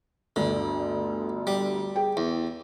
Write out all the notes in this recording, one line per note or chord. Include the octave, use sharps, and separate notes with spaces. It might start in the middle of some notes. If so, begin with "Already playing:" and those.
G1 D2 D3
G3
G#4 G5
E2